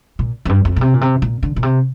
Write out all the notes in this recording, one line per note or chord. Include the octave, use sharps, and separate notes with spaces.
A#2
F2
G2
F2
A#2
C3
A#2
C3
A#2
D3
A#2
C3